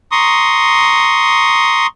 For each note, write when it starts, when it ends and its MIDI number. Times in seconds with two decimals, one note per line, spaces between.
0.12 1.87 82
0.12 1.87 84
0.12 1.87 85
0.12 1.87 87